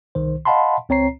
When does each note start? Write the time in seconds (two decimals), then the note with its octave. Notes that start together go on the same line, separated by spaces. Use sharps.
0.15 C2 D#3 C5
0.45 D#5 F5 F#5 A5 B5 C6
0.89 C#2 C4 C#5 A#5 C7